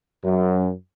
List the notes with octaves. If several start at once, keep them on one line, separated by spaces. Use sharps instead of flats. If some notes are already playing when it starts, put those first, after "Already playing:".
F#2